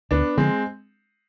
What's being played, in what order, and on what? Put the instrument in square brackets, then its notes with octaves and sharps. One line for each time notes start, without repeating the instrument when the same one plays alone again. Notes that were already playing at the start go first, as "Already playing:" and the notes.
[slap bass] D2 [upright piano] B3 D4
[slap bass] D3 F3 [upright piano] G#3 C4